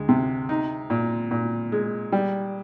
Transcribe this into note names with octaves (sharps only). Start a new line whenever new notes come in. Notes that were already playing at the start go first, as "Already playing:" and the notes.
Already playing: D2 G#3
C3
D#4
A#2
A#2
G#3
G3